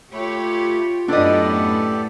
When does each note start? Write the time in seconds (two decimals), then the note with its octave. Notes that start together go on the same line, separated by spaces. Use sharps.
0.13 A3 F4 G4 C#5 B5
1.08 F#2 A2 B3 D4 G4 A4 D5 D#5